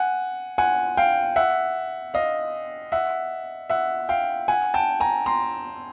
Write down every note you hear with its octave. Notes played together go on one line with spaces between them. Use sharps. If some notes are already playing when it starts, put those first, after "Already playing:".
Already playing: F#5 G#5
F#5 G#5
F5 G5
E5 F#5
D#5 F5
E5 F#5
E5 F#5
F5 G5
F#5 G#5
G5 A5
G#5 A#5
A#5 C6